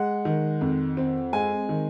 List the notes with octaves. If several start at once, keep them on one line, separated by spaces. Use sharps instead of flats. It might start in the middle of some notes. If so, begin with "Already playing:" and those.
Already playing: G#3 F#5
D#3
F2
C4
G#3 G#5
D#3